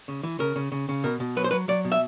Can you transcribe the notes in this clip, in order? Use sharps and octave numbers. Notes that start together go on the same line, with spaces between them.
C#3
E3
C#3 A#4
C#3
C#3
C#3
B2 A#4
B2
F#3 B4
C5
F#3 B4
F#3 D5
B2
E5